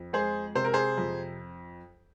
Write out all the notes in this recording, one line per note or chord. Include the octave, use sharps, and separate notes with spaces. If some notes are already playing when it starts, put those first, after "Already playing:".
Already playing: F2
G#3 G#4 C5
C3 C5
A#4
G#4 C5
F2